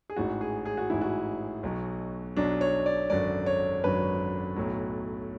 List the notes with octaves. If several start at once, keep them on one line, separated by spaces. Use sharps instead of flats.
G#4
A1 G#2 E3 F#4
G#4
G#4
F#4
A1 G#2 E3 E4
F#4
B1 B2 F#3
B1 B2 F#3 D4
C#5
D5
G#1 F#2 D3 F#3 D5
C#5
G#1 F#2 D3 F#3 B4
B1 A2 F#3